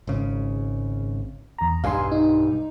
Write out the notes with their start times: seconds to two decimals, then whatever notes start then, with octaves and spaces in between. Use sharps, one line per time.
0.07 G#1 C#3
1.58 E2 A#5
1.84 B1 G2 F5 G#5 C6
2.12 D#4